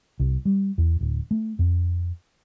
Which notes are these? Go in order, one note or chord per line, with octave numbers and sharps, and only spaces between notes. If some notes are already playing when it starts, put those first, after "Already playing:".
C2
G3
E2
D1
A3
F2